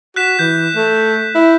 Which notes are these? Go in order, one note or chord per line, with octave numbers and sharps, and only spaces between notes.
F#4 F#6 B6 E7
E3 G6
A3
E4